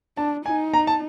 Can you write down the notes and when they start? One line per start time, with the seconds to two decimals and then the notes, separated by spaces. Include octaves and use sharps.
0.17 D4 A5
0.45 D#4 G#5
0.74 A#5
0.87 A5